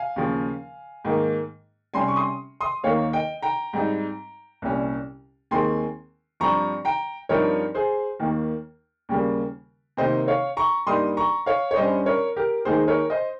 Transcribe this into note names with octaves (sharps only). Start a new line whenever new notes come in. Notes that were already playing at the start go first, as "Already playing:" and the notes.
Already playing: F5 G#5
D#2 C#3 F3
G#2 D#3 A#3
C3 G3 C#4 G#5 C6
C#6
C6 D#6
C6 D#6
D#2 D#3 A#3 C#5 F5
D#5 G5
G5 A#5
G#2 G3 C4 D#4
C2 A#2 G3 C#4
D#2 D#3 G#3 C4 G#5 C6
G2 F3 C4 A#5 C#6
G5 A#5
G2 F3 C4 D#4 A#4 C#5
G#4 C5
D#2 D#3 A#3
D#2 C#3 G3 A#3
C3 D#3 A#3 D#4 C5 D#5
C#5 F5
A#5 C#6
G2 G3 A#3 D#4 C6 D#6
A#5 C#6
C#5 F5
C#5
G2 G3 C#4 C5 D#5
A#4 C#5
G4 A#4
D#2 D#3 G#3 D#4 G#4 C5
A#4 C#5
C5 D#5